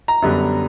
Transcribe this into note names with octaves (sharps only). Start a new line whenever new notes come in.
A#5
F#2 D3 G3 B3